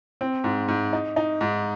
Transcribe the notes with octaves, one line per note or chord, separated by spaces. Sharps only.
C4
G#2
G#2
D#4
D#4
G#2